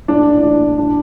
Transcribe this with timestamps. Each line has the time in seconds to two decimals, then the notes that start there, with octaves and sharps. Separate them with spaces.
0.08 A#1 D4
0.27 A2
0.43 E3 D4
0.60 A#1
0.78 D4